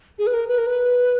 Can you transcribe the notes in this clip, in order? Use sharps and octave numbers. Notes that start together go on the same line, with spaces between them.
G#4
B4
A#4
B4
A#4
B4